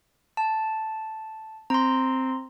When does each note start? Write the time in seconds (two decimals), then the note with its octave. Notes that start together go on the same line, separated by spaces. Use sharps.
0.37 A5
1.70 C4 A#5 C6